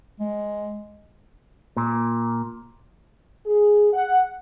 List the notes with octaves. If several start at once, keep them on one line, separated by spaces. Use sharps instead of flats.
G#3
A#2
G#4
F#5